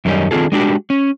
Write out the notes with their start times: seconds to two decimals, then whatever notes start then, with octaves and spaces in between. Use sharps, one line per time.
0.05 F#2 D#3 G3 C#4 D#4
0.31 D#3 C4 D4 F4 G#4 A4
0.52 G#3 D4 F#4 G4
0.90 C#4